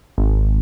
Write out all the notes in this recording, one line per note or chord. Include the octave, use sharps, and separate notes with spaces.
G#1